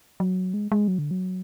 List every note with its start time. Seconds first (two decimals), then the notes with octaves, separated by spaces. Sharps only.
0.20 F#3
0.54 G#3
0.72 G#3
0.88 F#3
0.99 D3
1.11 F#3